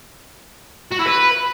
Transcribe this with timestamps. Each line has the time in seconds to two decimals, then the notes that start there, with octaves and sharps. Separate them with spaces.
0.91 F#4
0.99 E4
1.07 B4